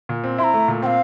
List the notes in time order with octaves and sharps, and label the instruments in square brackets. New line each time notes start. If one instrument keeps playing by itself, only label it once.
[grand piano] A#2
C4
[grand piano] E4 [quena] C6
[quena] A#5
[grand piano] A3
A#2
[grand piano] C4 [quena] G5
[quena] F5